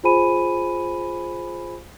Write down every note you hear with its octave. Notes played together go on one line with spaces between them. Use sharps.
F4 G#4 C5 G#5 B5 D#7